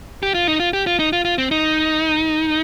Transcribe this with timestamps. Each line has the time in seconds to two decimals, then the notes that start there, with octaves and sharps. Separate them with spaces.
0.23 G4
0.34 F4
0.48 D#4
0.60 F4
0.73 G4
0.87 F4
0.99 D#4
1.13 F4
1.25 F4
1.38 C4
1.51 D#4